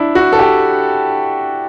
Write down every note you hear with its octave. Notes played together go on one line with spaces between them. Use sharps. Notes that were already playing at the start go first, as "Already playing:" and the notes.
Already playing: D4 E4
F#4
A4
G4